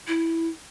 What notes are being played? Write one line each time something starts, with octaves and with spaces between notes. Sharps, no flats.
E4